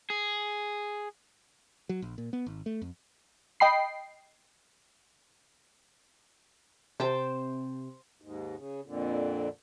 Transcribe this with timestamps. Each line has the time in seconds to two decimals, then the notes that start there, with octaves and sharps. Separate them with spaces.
0.10 G#4
1.89 F#3
2.02 A#1
2.18 A#2
2.33 B3
2.46 G#1
2.66 A3
2.82 F2
3.60 D#5 G5 B5 C7
7.00 C3 C5 G5 A5
8.22 D#2 G#2
8.57 C#3
8.85 F2 A#2 D3